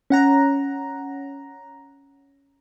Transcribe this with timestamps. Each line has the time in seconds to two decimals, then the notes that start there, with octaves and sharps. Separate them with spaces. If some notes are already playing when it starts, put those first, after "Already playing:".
0.10 C#4 F#5 A#5